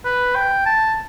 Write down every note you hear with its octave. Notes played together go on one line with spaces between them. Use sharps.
B4
G5
A5